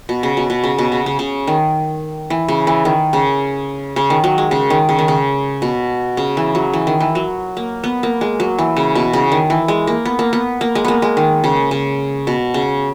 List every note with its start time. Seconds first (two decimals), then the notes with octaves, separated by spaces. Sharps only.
0.09 B2
0.23 C#3
0.37 B2
0.50 B2
0.64 C#3
0.79 B2
0.92 C#3
1.06 C#3
1.19 C#3
1.47 D#3
2.30 E3
2.49 C#3
2.67 E3
2.85 D#3
3.13 C#3
3.96 C#3
4.10 D#3
4.24 F#3
4.38 G#3
4.51 C#3
4.70 D#3
4.89 C#3
4.99 D#3
5.08 C#3
5.62 B2
6.17 C#3
6.37 E3
6.55 F#3
6.74 E3
6.87 D#3
7.00 E3
7.15 F#3
7.57 A#3
7.84 B3
8.03 A#3
8.21 G#3
8.40 F#3
8.59 E3
8.77 C#3
8.95 B2
9.13 C#3
9.32 D#3
9.50 E3
9.68 G#3
9.87 A#3
10.05 B3
10.19 A#3
10.33 B3
10.61 A#3
10.75 G#3
10.85 A#3 B3
11.02 G#3
11.17 D#3
11.44 C#3
11.71 C#3
12.27 B2
12.54 C#3